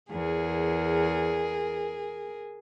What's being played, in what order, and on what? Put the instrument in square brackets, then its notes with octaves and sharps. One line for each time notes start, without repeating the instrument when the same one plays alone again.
[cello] E2 [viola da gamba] G#4 A#4